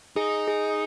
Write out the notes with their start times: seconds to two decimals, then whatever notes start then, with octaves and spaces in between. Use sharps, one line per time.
0.16 D#4 G#4
0.48 G#4